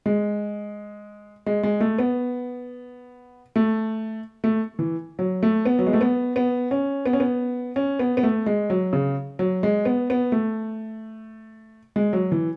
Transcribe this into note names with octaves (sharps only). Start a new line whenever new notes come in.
G#3
G#3
G#3
A3
B3
A3
A3
E3
F#3
A3
B3
F#3
G#3
A3
B3
B3
C#4
B3
C#4
B3
C#4
B3
B3
A3
G#3
F#3
C#3
F#3
G#3
B3
B3
A3
G#3
F#3
E3